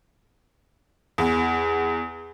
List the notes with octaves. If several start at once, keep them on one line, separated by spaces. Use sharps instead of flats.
E2